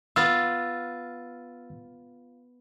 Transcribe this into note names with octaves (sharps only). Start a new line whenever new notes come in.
B3 F4 E6 F6 A6